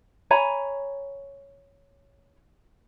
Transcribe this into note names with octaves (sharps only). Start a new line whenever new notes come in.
C#5 G#5 A#5 B5